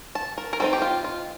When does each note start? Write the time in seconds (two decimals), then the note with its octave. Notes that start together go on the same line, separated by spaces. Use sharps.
0.15 A5
0.38 A#4
0.53 A#4
0.60 G3 C4 D#4 A4
0.73 G4
0.82 F4
1.04 F4